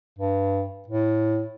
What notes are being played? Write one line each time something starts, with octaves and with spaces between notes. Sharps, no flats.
G2
A2